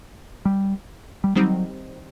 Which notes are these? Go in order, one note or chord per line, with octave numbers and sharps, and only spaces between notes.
G3
G3
D#3 F#3 G3 C4 D#4